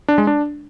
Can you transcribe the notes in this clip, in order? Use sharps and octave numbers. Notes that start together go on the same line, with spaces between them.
D4
G#3
D4